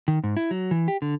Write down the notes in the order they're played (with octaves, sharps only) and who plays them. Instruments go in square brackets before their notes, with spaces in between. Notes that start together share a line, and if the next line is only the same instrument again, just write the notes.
[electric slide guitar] D#3
G#2
E4
F#3
E3
G4
D3